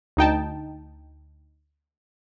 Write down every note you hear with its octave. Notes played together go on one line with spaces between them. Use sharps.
D2 D#4 G5 A5